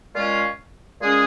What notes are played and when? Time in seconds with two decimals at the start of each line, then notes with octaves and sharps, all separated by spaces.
0.13 A#2 G#3 C#4 F4
1.01 A#2 G#3 C#4 G#4